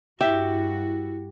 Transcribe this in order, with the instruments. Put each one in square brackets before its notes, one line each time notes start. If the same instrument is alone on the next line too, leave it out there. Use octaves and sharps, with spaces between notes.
[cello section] G2 F#4 [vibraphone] E4 [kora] G4 [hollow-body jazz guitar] E5